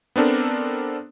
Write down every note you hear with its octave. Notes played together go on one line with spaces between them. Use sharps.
B3 C4 D4 A4 A#4